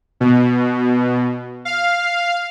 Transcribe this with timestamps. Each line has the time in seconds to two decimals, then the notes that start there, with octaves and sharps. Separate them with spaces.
0.20 B2
1.65 F5